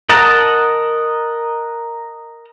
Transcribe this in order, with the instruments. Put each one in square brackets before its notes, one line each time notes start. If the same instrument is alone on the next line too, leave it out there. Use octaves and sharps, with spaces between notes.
[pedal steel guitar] A#4 D#5 F#5 A5 A#5